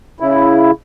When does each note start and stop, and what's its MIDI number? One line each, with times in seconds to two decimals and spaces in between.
0.20 0.71 49
0.20 0.71 64